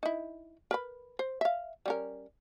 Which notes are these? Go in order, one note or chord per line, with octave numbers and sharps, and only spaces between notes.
D#4 E4
A#4 B4 B5
C5
E5 F5
G3 C#4 A#4